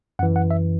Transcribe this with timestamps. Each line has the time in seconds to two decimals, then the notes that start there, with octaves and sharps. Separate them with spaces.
0.19 F#2 F#5
0.23 E3
0.36 F#5
0.51 E5